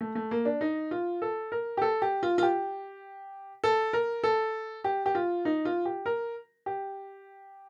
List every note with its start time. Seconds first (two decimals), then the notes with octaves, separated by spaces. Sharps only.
0.01 A3
0.15 A3
0.31 A#3
0.45 D4
0.61 D#4
0.91 F4
1.22 A4
1.52 A#4
1.77 G4
1.82 A4
2.02 G4
2.23 F4
2.38 F4
2.43 G4
3.64 A4
3.93 A#4
4.24 A4
4.84 G4
5.06 G4
5.15 F4
5.45 D#4
5.65 F4
5.85 G4
6.06 A#4
6.66 G4